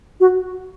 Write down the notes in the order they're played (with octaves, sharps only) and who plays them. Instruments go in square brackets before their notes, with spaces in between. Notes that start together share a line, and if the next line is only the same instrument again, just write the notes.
[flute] F#4